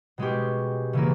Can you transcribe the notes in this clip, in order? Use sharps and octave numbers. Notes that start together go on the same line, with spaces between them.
B2 G#3 C#4 G4
C#3 E3 A#3